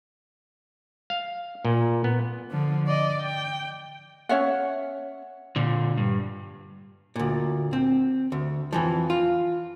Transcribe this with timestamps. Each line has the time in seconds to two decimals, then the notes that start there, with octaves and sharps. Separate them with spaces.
1.10 F5
1.65 A#2
2.04 B3
2.51 D3 F3
2.88 D5 D#5
3.21 G5
4.29 C#4 C#5 E5 F#5
5.56 A#2 D3
5.97 G2
7.16 D2 A#2
7.73 C4
8.32 D2
8.73 F2 E3 F3
9.10 F4